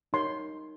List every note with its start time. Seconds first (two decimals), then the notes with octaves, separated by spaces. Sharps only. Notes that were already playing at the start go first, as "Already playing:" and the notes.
0.13 D#4 G4 A#4 C#5 C6